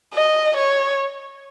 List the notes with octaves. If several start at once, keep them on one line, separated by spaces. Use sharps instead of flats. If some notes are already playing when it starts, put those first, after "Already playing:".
D#5
C#5